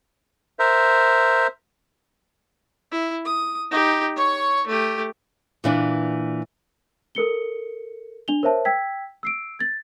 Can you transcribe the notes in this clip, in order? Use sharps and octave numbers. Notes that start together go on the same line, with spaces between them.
A#4 C5 E5
E4
D#6
D#4 G4
C#5 C#6
A3 G4
A#2 E3 D4
A4 A#4 C#7 G7
D4 F7 G7
A#4 C5 C#5 E5 A5
G5 E6 G#6 B6
E6 C7 D7
G#6 A6